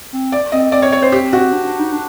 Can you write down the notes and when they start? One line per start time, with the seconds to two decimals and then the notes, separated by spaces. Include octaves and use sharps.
0.13 C4
0.32 D5
0.52 C4 D#5
0.72 C4 D5
0.82 C#5
0.92 C#5
1.02 C5
1.12 G4
1.33 F#4
1.53 D4
1.66 D4
1.79 D#4
1.92 D4